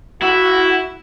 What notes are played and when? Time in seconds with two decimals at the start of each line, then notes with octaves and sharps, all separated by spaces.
0.22 E4 F#4